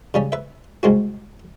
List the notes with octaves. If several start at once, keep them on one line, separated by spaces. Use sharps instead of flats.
C#3 G3 C#4
B4 E5
C2 G#3 C4 F#4